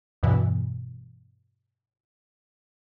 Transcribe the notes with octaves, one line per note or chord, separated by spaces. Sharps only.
E2 G2 B2 E3